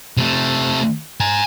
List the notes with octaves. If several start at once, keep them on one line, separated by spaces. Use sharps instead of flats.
C3 A3
G#5 A#5